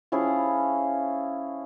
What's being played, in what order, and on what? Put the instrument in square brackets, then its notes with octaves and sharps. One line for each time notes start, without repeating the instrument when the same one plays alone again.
[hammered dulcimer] F3 C#4 E4 G#4